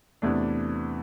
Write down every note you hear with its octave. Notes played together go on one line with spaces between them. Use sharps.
E2 C3 E3 A3 D4